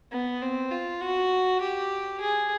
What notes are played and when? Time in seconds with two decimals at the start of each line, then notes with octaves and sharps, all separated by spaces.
0.12 B3
0.42 C4
0.71 F4
1.01 F#4
1.61 G4
2.21 G#4